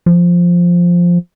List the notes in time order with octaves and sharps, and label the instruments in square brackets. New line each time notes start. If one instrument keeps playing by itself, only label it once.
[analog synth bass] F3